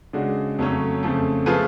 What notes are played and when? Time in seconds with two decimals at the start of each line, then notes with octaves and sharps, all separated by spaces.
0.13 C#3 G#3 D4 F#4
0.58 F2 C#3 F#3 A3 C#4
1.03 F2 C#3 F3 A3
1.46 F3 A3 F4 G#4 B4